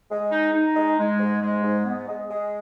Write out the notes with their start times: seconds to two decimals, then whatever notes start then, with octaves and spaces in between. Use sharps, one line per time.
0.09 G#3
0.31 D#4
0.53 D#4
0.75 G#3
0.97 G#3
1.18 G#2
1.40 G#3
1.62 G#2
1.84 B3
2.07 G#3
2.28 G#3